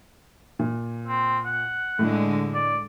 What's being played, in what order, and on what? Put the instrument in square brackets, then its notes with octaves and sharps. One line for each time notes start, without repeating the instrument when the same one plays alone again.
[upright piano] A#2
[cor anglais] C4
F#5
[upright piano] A2 [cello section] D3 G#3
[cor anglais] D5